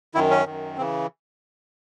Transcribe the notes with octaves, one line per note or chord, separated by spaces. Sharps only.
F#2 D#3 E4
C#4
F#2 D#3
C#3 E3 C4